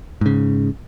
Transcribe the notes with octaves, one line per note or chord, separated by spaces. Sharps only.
G#2 C#3